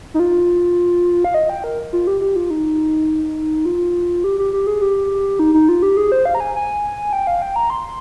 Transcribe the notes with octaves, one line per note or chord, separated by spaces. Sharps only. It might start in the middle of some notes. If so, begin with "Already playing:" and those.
D#4
F4
F5
D#5
G5
A#4
F4
G4
G4
F4
D#4
F4
G4
G4
G4
G#4
G4
D#4
D#4
F4
G4
G#4
C5
F5
A#5
G#5
G#5
G5
F5
G5
A#5
C6